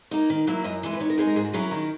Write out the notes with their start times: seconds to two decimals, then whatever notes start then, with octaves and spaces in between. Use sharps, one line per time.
0.11 A#3 D#4
0.30 D#3
0.47 F#3 A#3 E4
0.64 F#2 D#5
0.83 E3 G#3
0.93 B4
1.00 D#3 C#5
1.10 A#4
1.18 G#3 D#4 G#4
1.27 A#4
1.36 G#2 G#4
1.45 F#4
1.53 F#3 C#4 E4 G#4
1.63 A#4
1.71 D#3